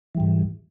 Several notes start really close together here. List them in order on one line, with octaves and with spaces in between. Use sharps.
E3 G3 G#2